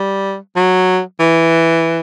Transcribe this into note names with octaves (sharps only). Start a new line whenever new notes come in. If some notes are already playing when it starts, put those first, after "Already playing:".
Already playing: G3
F#3
E3